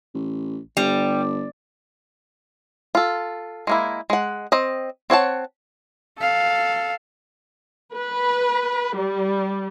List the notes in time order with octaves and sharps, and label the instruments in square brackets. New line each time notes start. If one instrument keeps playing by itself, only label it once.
[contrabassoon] A1
[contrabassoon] G1 [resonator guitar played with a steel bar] G3
[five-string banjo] F4 A4
G#3 A#3 E4
G#3 F#5
C4 D#5
C4 C#5 F#5 A5
[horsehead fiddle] A4 F5
[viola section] B4
G3